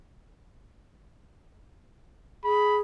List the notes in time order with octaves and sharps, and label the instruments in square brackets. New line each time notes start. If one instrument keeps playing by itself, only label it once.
[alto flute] G#4 [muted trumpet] B5